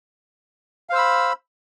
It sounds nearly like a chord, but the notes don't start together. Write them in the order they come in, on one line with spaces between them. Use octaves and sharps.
F5 C5 E6 B5